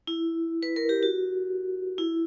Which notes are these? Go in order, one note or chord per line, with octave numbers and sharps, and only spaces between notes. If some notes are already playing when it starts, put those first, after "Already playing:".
E4
B4
A#4
G4
F#4
E4